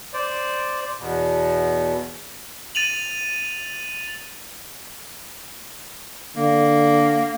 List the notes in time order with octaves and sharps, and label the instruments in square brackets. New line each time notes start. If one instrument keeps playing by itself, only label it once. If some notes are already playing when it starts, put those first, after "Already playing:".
[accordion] C5 D5
E2 B2
[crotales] A6 D#7 F7 F#7
[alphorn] D3 [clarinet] A#3